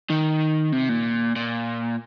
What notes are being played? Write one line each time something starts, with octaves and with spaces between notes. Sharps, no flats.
D#3
C3
A#2
A#2